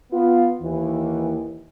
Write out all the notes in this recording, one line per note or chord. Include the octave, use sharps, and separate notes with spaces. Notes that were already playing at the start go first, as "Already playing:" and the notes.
B3 F4
D#2 E3